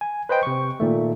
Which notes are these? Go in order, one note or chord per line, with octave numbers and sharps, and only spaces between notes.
G#5
B4 C5 D#5 G5
C3 C#6
A#2 D#3 A3